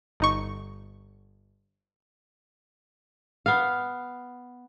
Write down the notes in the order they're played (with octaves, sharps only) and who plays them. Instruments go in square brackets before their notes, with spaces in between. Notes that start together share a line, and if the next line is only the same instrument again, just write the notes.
[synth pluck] G1 D#4 C#6
[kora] B3 F5